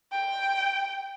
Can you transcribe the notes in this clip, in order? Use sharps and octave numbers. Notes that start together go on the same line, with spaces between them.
G5